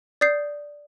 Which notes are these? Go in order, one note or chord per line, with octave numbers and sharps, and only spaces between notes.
D5 D#6 G6 C7